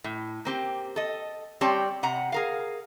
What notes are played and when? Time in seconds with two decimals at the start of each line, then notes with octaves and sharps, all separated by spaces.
0.04 A2
0.45 A#3 C4 G4
0.96 A4 D#5
1.61 G3 C4 G4 C#5 D5 A5
2.03 C3 F#5 A#5
2.32 G#4 A#4 F5